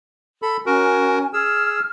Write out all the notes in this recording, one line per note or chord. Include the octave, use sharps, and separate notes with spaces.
A4 B5
C#4 F#4 A#4 G#5
G#4 E6 F6